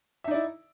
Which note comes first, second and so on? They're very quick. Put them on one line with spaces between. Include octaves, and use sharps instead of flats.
E5 D#4 D5 E4